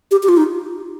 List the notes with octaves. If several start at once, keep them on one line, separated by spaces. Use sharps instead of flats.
G4
G4
F4
D#4